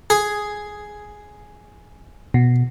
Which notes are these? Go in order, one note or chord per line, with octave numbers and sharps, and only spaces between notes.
G#4
B2